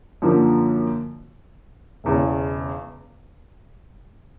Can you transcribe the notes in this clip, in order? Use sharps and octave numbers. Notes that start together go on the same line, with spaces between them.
F#2 D3 F3 A#3
E1 E2 C#3